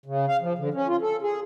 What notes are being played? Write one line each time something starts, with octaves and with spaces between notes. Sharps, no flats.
C#3
F5
F3
D3
C#4
F4
A4
G#4